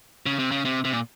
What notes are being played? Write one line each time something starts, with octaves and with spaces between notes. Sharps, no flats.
C#3
C3
C#3
C3
C3
A#2